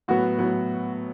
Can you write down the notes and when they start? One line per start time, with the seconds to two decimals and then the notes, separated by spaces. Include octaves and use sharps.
0.08 A2 F#3 B3 F#4
0.39 A2 F#3 B3